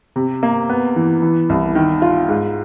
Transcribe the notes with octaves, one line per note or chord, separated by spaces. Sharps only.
C3
A#3
B3
E3
E3
C2
D#3
F4
G#2